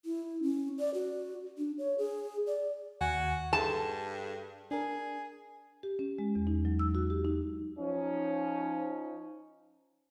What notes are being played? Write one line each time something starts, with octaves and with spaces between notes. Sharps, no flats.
E4
C#4
D5
F#4
D4
C#5
G#4
D5
D#2 F#4 G#5
G2 G#4 A4 A5
D4 G#4 A#4
G4
C#4
G#3
E2
D#4
F#3
E6
F#4
G4
D#4
F3 C#4 D#4